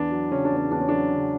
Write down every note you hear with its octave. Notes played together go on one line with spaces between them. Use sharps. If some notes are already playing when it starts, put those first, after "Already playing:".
Already playing: E2 D4
F#3
C#3 C#4
D4
E2
C#4
E2 D4
C#4
F#3 D4
C#3